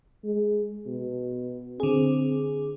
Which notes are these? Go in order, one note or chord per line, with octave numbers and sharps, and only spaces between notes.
G#3
B2
D3 C4 G#4